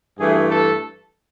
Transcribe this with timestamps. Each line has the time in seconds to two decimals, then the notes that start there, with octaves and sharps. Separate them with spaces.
0.18 G2 E3 A3 G#4
0.51 A4